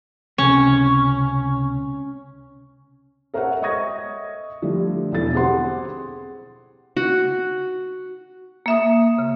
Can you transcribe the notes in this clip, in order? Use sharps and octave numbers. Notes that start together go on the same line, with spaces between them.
C#2 C3 C#4
A4 A#4 C5 C#5 E5 F#5
D#5 E5 C#6 D#6 G#6 A#6
D3 F3 G3 A3
B1 E2 D3 E4 A4 A6
C4 G4 G#4 C5 F#5 C6
F#4
A#3 E5 D#6
C#3